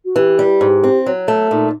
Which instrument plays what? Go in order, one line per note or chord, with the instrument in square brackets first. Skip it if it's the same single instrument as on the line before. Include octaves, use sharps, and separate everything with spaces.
[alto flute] F#4
[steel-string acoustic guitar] E3 [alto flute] G4
[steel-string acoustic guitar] G3
G#2
C4
F#3
A3
[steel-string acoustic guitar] A#2 [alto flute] D#4